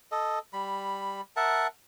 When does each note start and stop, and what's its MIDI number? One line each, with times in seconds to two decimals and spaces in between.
0.12 0.39 69
0.12 0.39 75
0.53 1.21 55
0.53 1.21 83
1.36 1.67 70
1.36 1.67 76
1.36 1.67 78
1.36 1.67 81